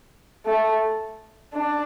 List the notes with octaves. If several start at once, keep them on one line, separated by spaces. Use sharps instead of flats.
A3
D4